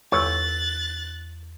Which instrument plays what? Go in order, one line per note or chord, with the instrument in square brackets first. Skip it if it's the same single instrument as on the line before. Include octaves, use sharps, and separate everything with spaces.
[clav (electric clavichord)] G1 C#5 [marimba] E2 E6 [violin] F#6 A6